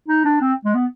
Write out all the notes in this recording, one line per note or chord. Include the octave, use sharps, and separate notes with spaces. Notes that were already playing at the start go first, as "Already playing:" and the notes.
D#4
D4
C4
G#3
B3